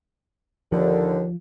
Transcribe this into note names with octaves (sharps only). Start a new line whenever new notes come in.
D#2 D3 F3